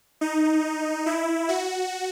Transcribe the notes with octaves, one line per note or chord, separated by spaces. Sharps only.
D#4
E4
F#4